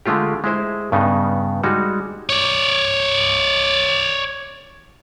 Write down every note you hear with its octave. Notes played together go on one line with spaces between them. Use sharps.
D3 G#3 A3 F4 G4
G#3 E4 C5
G2 C#3 B3 D#4
G3 G#3 D#4 F#4
C#5 D5